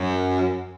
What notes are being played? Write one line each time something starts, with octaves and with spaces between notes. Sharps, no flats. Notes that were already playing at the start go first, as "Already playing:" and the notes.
Already playing: F#2